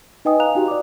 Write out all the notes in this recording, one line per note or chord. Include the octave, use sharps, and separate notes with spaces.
D#4 B4 D#5 G5 G#5 D#6
D#5 F5 G#5 A#5 F#6 F7
D#4 F#4 G4
D5 D6